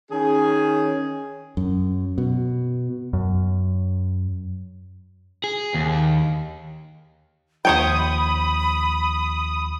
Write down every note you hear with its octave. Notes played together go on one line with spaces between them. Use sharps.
D#3 C#4 G#4
F#2
B2
F#2
G#4
D#2
D#2 F3 C5 C#5 G5 B5 D#6